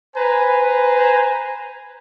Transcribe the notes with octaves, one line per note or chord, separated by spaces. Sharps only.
B4 C5 G#5 A#5